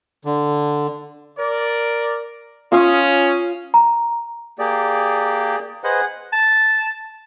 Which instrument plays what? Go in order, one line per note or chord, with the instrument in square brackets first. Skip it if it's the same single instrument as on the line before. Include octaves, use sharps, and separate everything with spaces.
[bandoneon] D3
[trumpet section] A#4 D5
[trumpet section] C#4 [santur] F4 D#6
[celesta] A#5
[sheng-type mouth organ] A#3 G4 [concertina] G#4 D5
[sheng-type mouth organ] G#4 F#5 [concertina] B4 C5 D#5
[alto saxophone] A5